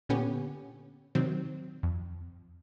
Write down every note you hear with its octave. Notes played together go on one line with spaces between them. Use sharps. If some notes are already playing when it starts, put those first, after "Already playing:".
A#2 D3 B3 C#4 G4
C3 D#3 F#3 C4
F2